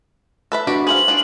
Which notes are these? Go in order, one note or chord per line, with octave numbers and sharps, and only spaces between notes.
A4 B4 E5
D4 F#4 G4 B4
G#4 C5 F5 F#7
D4 F4 G#4